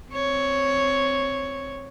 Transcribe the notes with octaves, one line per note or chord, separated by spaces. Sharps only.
C4 C#5